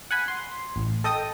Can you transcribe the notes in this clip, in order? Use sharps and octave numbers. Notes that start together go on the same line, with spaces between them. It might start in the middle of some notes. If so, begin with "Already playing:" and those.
F#5 G#5 B5
C6
A1
A4 D#5 G5 D#6